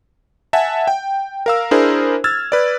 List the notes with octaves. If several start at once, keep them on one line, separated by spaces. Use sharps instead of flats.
E5 F#5 G#5 A5
G5
A#4 F5 E6
D4 E4 G#4 A#4 C5
E6 F6 G#6 A6
B4 D5